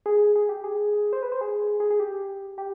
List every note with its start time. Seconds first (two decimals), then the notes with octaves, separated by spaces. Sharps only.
0.06 G#4
0.36 G#4
0.49 G4
0.64 G#4
1.13 C5
1.23 B4
1.32 C5
1.41 G#4
1.80 G#4
1.90 G#4
2.00 G4
2.58 G4